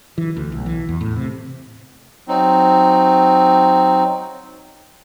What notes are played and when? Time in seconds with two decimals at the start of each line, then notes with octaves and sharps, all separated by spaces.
0.18 E3
0.37 D2
0.52 B1
0.66 E3
0.89 E2
1.01 A2
1.17 C3
2.28 F#3 C4 D#4